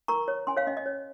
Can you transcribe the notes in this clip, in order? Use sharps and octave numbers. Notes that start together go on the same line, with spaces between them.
A#4 A#5 C#6
C#5
C#4 G#5 C6
C#5 F5
C#4 D#5
D#5
C#5